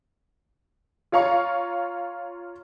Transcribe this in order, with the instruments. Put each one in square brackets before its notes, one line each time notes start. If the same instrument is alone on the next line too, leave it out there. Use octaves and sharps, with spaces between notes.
[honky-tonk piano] F4 C#5 F5 A#5 C#6